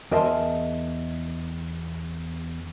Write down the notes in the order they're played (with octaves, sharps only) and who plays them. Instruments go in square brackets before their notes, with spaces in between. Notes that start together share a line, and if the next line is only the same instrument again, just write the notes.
[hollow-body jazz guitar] E2 A#4 D#5 E5 A5 C6